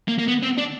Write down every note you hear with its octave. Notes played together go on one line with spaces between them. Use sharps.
A#3
A#3
B3
C4
D4